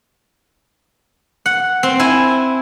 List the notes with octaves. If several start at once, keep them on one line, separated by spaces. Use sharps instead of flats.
F#5
C4
E4 G#5